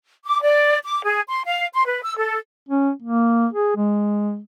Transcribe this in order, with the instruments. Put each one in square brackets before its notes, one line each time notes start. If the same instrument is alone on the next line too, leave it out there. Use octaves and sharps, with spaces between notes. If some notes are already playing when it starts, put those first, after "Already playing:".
[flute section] D6
D5
D6
G#4
C6
F5
C6
B4
E6
A4
[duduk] C#4
A#3
G#4
G#3